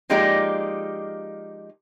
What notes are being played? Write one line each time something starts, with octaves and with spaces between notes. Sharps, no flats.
F3 G#3 A#3 D#4 G4 D5